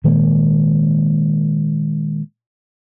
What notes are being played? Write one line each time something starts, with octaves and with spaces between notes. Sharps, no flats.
A#2 D#3 G#3 A#3